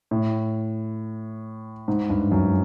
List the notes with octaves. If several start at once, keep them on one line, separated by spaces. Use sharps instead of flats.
A2
G#2
G2
F#2